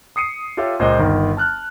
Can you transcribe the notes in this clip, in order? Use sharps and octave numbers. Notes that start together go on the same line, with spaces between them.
D#6 C7 C#7 D#7
F4 G4 A4 C#5 E5 F5
C#2 A#2 C5 D5 D#5
G1 D#3 A#4
A5 F6 F#6